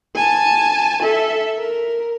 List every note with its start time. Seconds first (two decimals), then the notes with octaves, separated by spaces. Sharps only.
0.15 G#5 A5
1.03 A4 E5
1.58 A#4